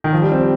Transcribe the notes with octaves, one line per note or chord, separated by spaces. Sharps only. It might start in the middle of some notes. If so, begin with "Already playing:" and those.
D#3
F3
G3
C4